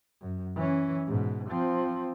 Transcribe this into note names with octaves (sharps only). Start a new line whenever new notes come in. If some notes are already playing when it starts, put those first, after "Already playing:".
F#2
E3 C#4
G#2 B2
F3 C4